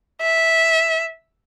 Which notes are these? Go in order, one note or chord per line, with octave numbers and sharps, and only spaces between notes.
E5